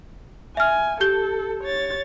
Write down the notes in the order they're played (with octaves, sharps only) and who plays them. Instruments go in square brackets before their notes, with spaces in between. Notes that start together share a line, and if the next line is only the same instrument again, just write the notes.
[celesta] E5 F6 [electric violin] G#5
[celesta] G4 G6 G7 [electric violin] A4
[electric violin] C#5 A6